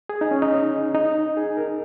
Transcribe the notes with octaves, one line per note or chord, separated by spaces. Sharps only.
G#4
D#4
C#4
D#4
D#4
G#4
A#4